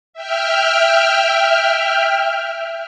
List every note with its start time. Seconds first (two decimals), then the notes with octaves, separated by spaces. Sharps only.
0.13 E5 G5 F6